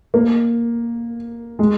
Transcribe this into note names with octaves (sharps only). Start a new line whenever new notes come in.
A#3
G#3